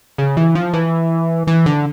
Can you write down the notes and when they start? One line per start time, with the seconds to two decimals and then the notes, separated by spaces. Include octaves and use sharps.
0.18 C#3
0.37 E3
0.55 F3
0.73 E3
1.47 E3
1.66 D3